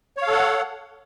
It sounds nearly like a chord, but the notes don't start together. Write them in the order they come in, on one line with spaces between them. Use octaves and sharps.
C#5 F5 A4 F#5